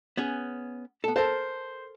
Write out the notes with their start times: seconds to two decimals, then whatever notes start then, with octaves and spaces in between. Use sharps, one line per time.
0.17 B3 C#4 G#4
1.04 B3 A4
1.16 A4 A#4 C5 A5